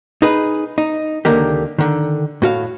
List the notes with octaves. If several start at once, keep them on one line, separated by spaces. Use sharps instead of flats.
D#4 G#4 B4
D#4
C#2 D3 D#3 A#3 G4
D3 D#3
A2 F#4 F5